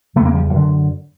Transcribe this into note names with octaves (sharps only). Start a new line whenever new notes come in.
C#3 A3 B3
E2 A#3 C4
F3 G3
F#2 D3